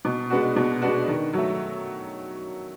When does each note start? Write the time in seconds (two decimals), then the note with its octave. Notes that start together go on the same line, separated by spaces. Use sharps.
0.05 B2
0.30 G#3 B3 D4 F#4
0.56 B2
0.82 G#3 B3 D4 F#4
1.08 D#3
1.33 F#3 A3